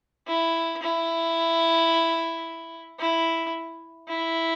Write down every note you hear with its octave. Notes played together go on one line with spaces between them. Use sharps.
E4
E4
E4
E4